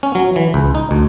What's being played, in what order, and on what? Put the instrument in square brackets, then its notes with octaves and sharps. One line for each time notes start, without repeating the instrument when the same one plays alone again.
[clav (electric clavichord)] C#4
F#3
E3
C#2
D#4
D2